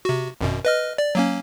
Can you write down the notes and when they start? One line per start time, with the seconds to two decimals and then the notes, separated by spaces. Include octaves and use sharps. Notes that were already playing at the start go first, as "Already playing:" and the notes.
0.05 C3 F#4
0.41 G#1 F#2 B2
0.65 B4 D#5 F6
0.98 D5
1.15 F#3 A#3 C#4